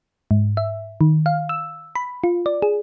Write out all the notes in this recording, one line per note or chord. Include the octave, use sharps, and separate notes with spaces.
G#2
E5
D#3
F5
E6
B5
F4
D5
G#4